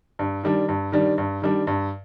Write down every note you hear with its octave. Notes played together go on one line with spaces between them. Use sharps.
G2
D#3 G3 D4
G2
D#3 G3 D4
G2
D#3 G3 D4
G2